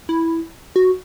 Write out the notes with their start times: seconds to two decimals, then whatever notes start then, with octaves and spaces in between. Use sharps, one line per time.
0.09 E4
0.76 F#4